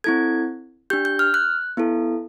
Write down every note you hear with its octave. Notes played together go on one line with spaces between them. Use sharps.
C4 E4 A4 G#6
D4 G4 G6
G6
F6
F#6
B3 E4 A4